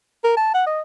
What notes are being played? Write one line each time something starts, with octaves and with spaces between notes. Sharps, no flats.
A#4
A5
F#5
D#5